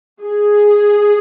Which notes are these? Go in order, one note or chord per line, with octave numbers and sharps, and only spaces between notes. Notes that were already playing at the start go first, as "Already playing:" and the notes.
G#4